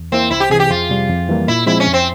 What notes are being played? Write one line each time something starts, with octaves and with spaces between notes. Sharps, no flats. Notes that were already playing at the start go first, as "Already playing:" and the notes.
Already playing: E2
E3 A#3 C4 E4
C2 E4
G4
C3 E3 G#4
G4
F2 F4
C3 G3
F2
E3 G3 A#3
A#2 E4
F3 G#3 C4 E4
C#4
F2
C4